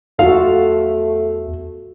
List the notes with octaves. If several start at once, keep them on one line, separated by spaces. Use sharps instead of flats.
E2 A3 F4 F#4 A4 F5